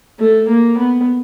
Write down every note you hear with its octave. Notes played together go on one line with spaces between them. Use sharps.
A3
A#3
B3